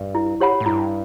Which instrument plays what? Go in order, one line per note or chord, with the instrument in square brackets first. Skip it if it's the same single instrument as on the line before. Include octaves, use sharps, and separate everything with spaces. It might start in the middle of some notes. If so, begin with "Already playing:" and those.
Already playing: [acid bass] G2
[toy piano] E4
G4 C#5 F#5 B5
[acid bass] A2
[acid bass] G2 [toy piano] E4